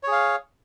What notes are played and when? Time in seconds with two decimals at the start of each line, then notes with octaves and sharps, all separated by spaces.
0.03 C#5
0.08 G#4
0.12 F5